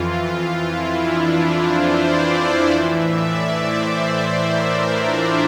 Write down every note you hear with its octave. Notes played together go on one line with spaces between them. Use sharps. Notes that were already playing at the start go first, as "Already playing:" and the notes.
Already playing: F2 E3 F4
F4
E4
D4
F4
C5
D5
A2 E3 E5
D5
C5
C5
A#4
D4
F4